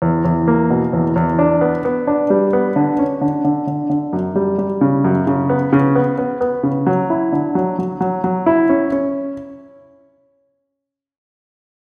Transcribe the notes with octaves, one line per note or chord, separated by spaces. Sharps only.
E2
E2
A#3
B2
E2
E2
D4
B3
B3
D4
G3
B3
D3
C#4
D3
D3
D3
D3
F#2
G3
G3
C#3
F#2
C#3
B3
C#3
B3
B3
B3
C#3
F#3
E4
D3
F#3
F#3
F#3
F#3
E4
C#4
C#4